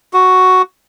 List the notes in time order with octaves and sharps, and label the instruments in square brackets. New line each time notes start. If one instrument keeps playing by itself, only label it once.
[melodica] F#4